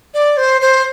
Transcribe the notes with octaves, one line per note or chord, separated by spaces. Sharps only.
D5
C5
C5